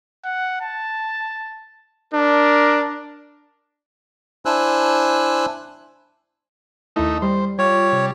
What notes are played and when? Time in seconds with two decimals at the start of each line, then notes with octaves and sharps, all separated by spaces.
0.24 F#5
0.61 A5
2.13 D4 A#4
4.46 D4 E4 C5 G#5 E6 F#6
6.96 D#2 A3 D#4 E4
7.22 G3 C5
7.59 G3 F4 C#5
7.92 C3